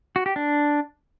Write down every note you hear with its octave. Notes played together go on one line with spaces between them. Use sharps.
F#4
G4
D4